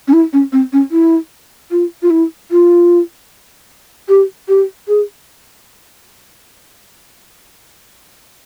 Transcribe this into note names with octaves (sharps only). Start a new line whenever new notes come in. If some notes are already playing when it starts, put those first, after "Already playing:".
C#4
E4
C#4
C4
C#4
E4
F4
F4
E4
F4
G4
G4
G#4